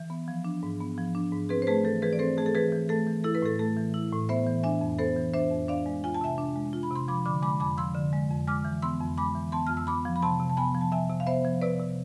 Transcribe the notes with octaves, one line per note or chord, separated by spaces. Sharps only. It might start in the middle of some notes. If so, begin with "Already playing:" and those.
Already playing: E3
B3
F3
D4
G#2
B3
F3
D4
G#2
C4 G#4 B4
C5
A3 G#4 B4
E3 A4
E3 G#4 B4
D5
C4 A4 C5
A3 G#4
A4
E3 G#4 B4
E3
A3 A4
E3
E4 A4
B4
A2 A4
A3 A4
E3
E4
A2
B3 C5 E5
E3
D4 E5 G#5
F2
B3 A4 C5
E3
D4 C5 E5
F2
D4 D5 F5
G#3
F4 G#5
A5
C3 E5 G#5
D4
G#3
F4
B5
C3 C6
F3 B5 D6
D3 B5 D6
G#3 B5 D6
F2 B5 D6
F3 C6 E6
D3
G#3
F2
G#3 D6 F6
E3
B3 C6 E6
F2
G#3 B5 D6
E3
B3 A5 C6
F2 F6
E6
B3 B5 D6
F3
B5
C3 A5 C6
C3
A5
B3 G#5 B5
F3
A5
C3 E5 G#5
C3
F5
B3 C5 E5
F3
C3 B4 D5
C3